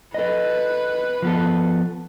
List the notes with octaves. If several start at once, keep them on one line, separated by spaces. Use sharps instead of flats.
A4 B4 D#5
F3 B3 A4